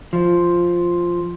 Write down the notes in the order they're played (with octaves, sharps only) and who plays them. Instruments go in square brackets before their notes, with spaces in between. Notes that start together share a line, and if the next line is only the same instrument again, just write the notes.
[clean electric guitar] F3